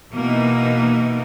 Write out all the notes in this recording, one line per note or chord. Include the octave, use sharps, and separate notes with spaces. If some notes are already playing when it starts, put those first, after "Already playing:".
B2 E3 A#3 D#4